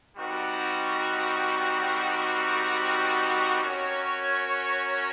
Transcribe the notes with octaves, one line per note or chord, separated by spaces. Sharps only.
G3 C4 D#4 F#4 A#4
C#4 F#4 A#4 C#5